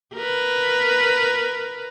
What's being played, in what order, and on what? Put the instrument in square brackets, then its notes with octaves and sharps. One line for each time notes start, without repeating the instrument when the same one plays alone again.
[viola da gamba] A#4 B4